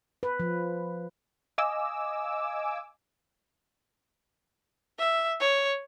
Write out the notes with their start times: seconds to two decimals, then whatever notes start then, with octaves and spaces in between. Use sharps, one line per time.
0.23 B4
0.40 F3
1.58 D#5 F5 G#5 D6 E6
4.99 E5
5.40 C#5